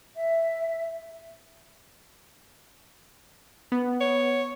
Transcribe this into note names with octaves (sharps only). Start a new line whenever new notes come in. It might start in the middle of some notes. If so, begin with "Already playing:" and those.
E5
B3
C#5